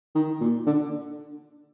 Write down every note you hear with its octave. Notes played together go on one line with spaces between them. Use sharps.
D#3
A#2
D3